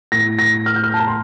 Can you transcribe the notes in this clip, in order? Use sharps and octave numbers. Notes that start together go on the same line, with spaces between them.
A2 A#6
A#6
F6
G6
F6
A5
A#5
C6